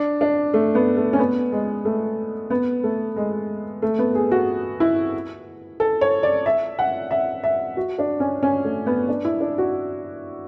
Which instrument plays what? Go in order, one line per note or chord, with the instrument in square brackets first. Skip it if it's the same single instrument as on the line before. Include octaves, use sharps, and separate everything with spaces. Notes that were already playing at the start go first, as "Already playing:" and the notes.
Already playing: [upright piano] D4
D4
A3
B3
A3
C#4
B3
G#3
A3
B3
A3
G#3
A3
B3
G#4
F#4
E4
A4
C#5
D5
E5
F#5
E5
E5
F#4
D4
C#4
C#4
A3
B3
D4
E4
D4
F#4